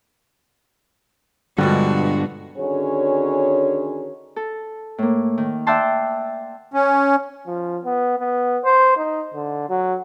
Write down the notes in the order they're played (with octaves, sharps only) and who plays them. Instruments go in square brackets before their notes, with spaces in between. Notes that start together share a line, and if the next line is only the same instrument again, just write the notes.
[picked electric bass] G2 [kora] B2 F3 G3 [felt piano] D3 [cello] G#3 F#4
[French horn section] D3 D#3 C#4 F#4 G#4 C#5
[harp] A4
A2 A#3
D#3
D5 E5 F#5 G5 A5 C6
[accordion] C#4
[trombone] F3
B3
B3
C5
D#4
D3
F#3